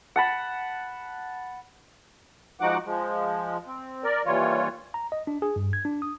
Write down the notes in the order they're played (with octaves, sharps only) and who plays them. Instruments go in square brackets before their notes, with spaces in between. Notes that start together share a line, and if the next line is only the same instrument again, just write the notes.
[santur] F#5 A5 B5
[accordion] F3 G#3 D#4 F#4 F#5 D6
F3 G#3
C4
A#4 D5
D#2 E3 G3 F4 C#5
[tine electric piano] A#5
D#5
D4
G#4
G2
G#6
D4
D#6